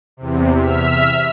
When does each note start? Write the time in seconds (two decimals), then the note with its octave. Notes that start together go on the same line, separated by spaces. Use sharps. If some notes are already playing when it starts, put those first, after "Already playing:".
0.17 E2 C3
0.59 E5 F6 B6